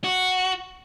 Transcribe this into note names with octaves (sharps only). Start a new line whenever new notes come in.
F#4